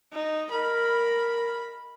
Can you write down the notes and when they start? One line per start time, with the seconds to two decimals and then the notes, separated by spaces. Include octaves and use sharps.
0.12 D#4
0.51 A#4 B5